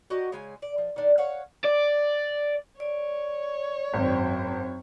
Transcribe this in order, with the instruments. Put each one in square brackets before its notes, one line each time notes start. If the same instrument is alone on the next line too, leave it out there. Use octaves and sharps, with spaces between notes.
[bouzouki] F#4 G4 A#4 D#5
C#3 G#3 G#5
D5
F3
D#3 D4
C#5 F5 F#5
[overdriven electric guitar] D5
[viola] C#5 [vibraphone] D5
[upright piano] G#1 [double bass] F#2 C4